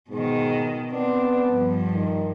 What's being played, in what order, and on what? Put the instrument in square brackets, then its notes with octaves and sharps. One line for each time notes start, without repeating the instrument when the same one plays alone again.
[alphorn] G#2 [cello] B2 D#3
[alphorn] B3 [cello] C4 D4
[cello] G2 F3
[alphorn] D#3